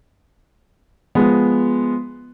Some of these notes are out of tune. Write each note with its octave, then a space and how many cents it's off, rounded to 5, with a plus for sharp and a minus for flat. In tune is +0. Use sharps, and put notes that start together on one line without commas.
F3 +0 G#3 +0 B3 +0